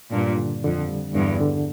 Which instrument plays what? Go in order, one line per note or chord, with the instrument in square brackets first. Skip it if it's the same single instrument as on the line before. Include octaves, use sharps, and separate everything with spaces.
[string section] G2 A#2 [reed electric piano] D4
[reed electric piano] D3
[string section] F2 [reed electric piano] D3
[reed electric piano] G3
[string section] E2 G2 [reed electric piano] D3
[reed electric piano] D3